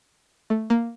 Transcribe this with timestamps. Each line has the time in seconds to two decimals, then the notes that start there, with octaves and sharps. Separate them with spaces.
0.50 A3
0.70 A#3